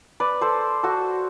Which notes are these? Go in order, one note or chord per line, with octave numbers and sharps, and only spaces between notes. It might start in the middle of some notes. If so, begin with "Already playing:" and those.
B4 D5
A4 C5
F#4 A4